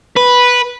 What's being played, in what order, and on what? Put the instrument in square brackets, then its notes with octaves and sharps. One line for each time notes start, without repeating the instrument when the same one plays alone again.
[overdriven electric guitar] B4